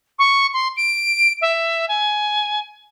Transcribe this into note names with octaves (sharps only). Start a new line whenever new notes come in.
C#6
C6
D7
E5
G#5